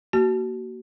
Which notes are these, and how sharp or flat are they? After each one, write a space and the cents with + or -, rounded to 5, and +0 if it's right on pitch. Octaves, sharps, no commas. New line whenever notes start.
A#3 +0 F#4 +30